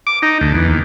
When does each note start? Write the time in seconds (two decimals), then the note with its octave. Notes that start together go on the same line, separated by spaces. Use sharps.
0.07 D6
0.22 D#4
0.41 D2
0.54 E2
0.68 D#2